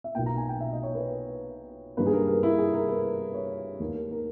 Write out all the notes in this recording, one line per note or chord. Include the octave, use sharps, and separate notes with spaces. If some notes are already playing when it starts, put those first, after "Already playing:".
E5
B1 B2 A#3 G5
A#5
G#5
G5
E5
D#5
C#5
B4
G2 D#3 A#3 B4
G#4
A#4
A#4
E4
G#4
A#4
B4
C#5
D#2 D#3 A#3 A#4
A#4
A#4